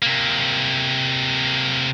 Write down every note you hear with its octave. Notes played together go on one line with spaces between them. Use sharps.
C3 A#3